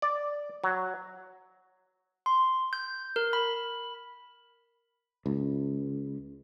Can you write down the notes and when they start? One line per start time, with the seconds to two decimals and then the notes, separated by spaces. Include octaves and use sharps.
0.02 D5
0.64 F#3
2.26 C6
2.73 G6
3.16 A#4
3.33 B5
5.26 C#2